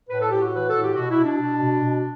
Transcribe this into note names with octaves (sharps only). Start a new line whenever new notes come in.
A2 B4
A4
A2 G4
F#4
E3 B4
A2 A4
G4
B2 F#4
E4
B2
D4
B2
B2
B2